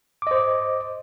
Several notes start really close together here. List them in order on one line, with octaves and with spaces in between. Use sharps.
D6 D#5 C5